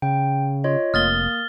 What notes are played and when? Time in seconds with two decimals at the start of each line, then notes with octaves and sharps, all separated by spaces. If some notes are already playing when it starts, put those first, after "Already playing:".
0.02 C#3 G5
0.64 F4 C#5 D#5
0.94 F1 A#3 D#6 F6 A6 G7